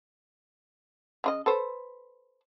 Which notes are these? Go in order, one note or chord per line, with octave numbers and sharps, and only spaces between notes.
C#3 F4 D#5
A4 B4 C5